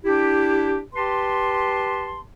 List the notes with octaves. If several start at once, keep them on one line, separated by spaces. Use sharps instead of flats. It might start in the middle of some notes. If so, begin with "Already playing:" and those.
D4 E4 G4
G4 B4 A5 C6